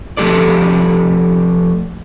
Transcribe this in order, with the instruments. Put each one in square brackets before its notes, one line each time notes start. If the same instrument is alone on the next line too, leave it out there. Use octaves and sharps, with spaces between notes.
[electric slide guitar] F3 A3 G4 A4 D5